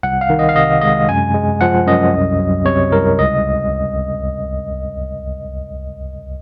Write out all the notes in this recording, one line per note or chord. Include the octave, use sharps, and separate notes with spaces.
C2 F#5
F5
D#3
D#5
F5
C3 D#5
G#3 D#5
F#2 G#5
G#3
F3 F#5
F#2 D#5
C2
F#3
C3 C#5
C2 A#4
C#2 D#5